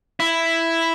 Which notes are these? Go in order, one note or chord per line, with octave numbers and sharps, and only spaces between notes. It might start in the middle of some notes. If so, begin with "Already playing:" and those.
E4